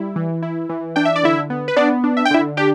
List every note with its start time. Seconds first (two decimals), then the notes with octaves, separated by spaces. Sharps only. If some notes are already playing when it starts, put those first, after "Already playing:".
Already playing: G3 E4
0.16 E3
0.42 E4
0.69 E3
0.96 D4 G5
1.05 E5
1.16 D5
1.23 D3 E4 E5
1.50 B3
1.68 B4
1.76 B3 D4 D5
2.04 D4
2.17 E5
2.25 G5
2.31 D3 E4 E5
2.57 D4 G4 G5